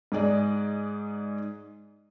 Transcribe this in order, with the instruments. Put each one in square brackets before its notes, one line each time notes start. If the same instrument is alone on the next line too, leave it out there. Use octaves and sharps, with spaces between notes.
[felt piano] G#2 G#4 D5 D#5